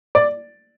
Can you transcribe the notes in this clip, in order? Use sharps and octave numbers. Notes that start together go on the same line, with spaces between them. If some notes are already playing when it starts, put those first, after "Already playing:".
D5